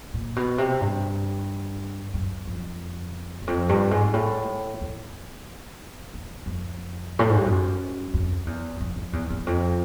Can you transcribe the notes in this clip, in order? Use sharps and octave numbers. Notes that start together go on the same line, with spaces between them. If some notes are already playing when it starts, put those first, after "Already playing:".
A#2
B2
C3
G2
F#2
F2
E2
F2
G2
G#2
A2
E2
E2
F2
A2
G#2
G2
F#2
F2
E2
F2
F2
E2
E2
F2